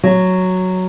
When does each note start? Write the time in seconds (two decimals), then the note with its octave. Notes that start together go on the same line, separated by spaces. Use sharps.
0.03 F#3